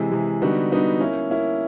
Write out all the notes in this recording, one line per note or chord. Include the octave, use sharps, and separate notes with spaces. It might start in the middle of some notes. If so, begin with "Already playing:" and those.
Already playing: C3 E3 G#3
C3 E3 G#3
D3 G3 B3 D#4 F#4
D3 G3 B3 D#4 F#4
A#3 C#4 E4
A#3 C#4 E4